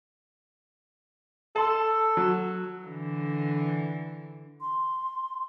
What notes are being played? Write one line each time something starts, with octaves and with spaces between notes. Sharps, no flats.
A4 A5 C6
F#3
D3 E3
C6